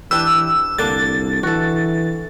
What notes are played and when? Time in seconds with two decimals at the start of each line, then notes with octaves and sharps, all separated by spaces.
0.11 E3 D4 G4 B4 E6
0.78 C2 D3 A#3 D4 A6
1.43 E3 F#4 A4